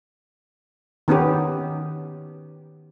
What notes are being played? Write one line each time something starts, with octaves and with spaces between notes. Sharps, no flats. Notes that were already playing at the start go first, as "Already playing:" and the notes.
D#3 B3 C#4 G4